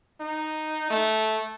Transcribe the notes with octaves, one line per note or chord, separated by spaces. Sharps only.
D#4
A3